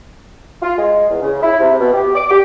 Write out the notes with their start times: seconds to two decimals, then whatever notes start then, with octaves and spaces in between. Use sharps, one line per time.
0.62 F4
0.77 G#3
1.10 E2
1.22 C#3
1.43 E4
1.60 C3
1.80 B2
1.93 G4
2.15 D6
2.31 G4